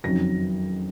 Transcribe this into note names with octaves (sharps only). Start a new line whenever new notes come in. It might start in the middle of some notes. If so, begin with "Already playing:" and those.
F#1 F2 D#3 F#3 A#6